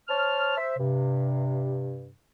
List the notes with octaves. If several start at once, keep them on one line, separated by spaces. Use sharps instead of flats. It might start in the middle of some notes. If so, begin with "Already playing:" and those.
C5 C#5 A5 F6
C5 E5
G2 C3